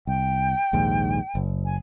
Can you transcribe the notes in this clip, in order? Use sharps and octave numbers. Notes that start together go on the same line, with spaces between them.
C2 G5
A#1 D#2 G#2
F#1
G#5